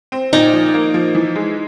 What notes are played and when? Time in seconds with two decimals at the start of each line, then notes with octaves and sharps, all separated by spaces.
0.12 C4
0.33 A#2 D#4
0.53 F3
0.74 A#3
0.94 F3
1.15 E3
1.36 G#3